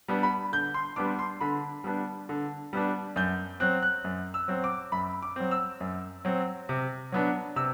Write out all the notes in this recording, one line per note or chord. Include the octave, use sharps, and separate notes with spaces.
G3 B3 D4
B5
D3 G6
C6
G3 B3 D4 D6
C6
D3 B5
G3 B3 D4
D3
G3 B3 D4
F#2 G6
F#3 C4 F#6
F#6
F#2
E6
F#3 C4
D6
F#2 B5
D6
F#3 C4
E6
F#2
F#3 C4
C3
F#3 B3 D4
C3 E6